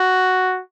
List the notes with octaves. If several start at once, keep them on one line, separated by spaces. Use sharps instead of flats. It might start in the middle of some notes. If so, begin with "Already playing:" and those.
Already playing: F#4